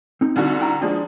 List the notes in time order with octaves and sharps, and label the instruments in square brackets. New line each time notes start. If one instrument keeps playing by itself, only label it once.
[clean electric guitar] C4 D#4
[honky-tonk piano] C2 D3 F#4
[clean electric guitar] G5 A#5
[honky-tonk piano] F3 G#3 [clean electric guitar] D4 D5